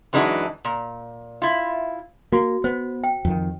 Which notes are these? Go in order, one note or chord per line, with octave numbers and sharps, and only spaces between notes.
F#2 E3 G#3 D4 D#4 F#4
A#2
E4 F4
A#3 F#4
B3 C5
G5
F2 D#3